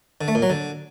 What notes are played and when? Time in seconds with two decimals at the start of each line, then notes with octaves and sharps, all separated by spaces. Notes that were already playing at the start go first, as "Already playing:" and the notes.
0.21 D3
0.28 A3
0.35 A#2
0.42 F#3
0.50 D3